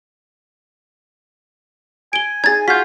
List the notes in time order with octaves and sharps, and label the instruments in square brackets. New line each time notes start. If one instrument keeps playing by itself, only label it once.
[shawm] G#5 [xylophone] D7 G7
[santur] D#4 G#4 [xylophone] G#6 A6
[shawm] F4 [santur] F#4 [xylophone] G6 B6